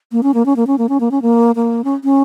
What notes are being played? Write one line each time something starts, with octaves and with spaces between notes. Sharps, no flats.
A#3
C#4
A#3
C#4
A#3
C#4
A#3
C#4
A#3
C#4
A#3
A#3
C#4
C#4